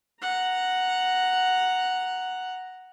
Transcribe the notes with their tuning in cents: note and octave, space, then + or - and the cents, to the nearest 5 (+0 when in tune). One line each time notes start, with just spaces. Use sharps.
F#5 +0 A#5 +0